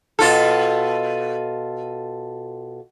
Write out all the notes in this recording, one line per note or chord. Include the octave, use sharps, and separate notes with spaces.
B2 F4 A4